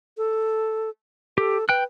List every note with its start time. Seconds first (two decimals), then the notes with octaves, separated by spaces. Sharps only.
0.18 A4
1.38 G4 A4
1.69 B4 G5 F#6